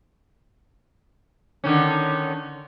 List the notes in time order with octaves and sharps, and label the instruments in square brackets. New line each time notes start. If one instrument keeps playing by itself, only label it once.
[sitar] D3 D#3 C#4